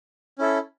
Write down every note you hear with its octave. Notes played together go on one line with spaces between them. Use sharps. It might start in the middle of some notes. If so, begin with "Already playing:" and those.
C#4 E4 A4